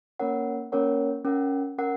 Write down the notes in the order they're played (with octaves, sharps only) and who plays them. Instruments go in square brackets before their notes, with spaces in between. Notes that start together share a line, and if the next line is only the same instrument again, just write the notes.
[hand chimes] A#3 C#4 A#4 C#5 F#5
A#3 C#4 A#4 C#5 F#5
C#4 A#4 F#5
C#4 A#4 F#5